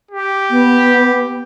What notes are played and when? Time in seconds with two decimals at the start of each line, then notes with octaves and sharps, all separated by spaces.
0.11 G4
0.50 B3